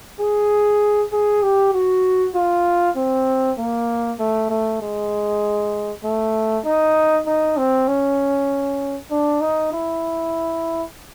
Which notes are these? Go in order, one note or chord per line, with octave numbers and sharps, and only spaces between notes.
G#4
G#4
G4
F#4
F4
C4
A#3
A3
A3
G#3
A3
D#4
D#4
C4
C#4
D4
D#4
E4